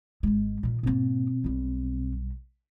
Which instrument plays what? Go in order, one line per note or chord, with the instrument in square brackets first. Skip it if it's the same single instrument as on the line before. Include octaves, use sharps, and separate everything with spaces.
[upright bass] G#1 G#3
A#2 D#3
[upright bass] G#2 A#3 [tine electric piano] B2 C4
[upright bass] B1 G3